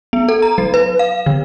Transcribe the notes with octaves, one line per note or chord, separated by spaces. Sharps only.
B3
A4
A#5
F#3
B4
F5
D3